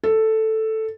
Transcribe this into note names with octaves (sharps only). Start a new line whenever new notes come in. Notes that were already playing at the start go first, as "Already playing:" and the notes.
A4